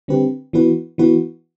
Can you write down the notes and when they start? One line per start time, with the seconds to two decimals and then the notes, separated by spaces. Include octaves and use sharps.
0.08 D3 G3 C4 G4 B4
0.53 E3 B3 F#4 B4
0.98 E3 B3 F#4 B4